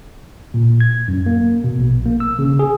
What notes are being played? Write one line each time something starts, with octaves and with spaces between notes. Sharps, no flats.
A#2
G#6
F#2
A#3
B2
A#1
A#3
E6
C#3
G#4